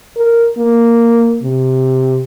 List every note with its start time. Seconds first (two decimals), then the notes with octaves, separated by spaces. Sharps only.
0.17 A#4
0.58 A#3
1.43 C3